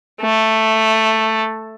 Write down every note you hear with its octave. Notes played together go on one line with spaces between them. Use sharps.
A3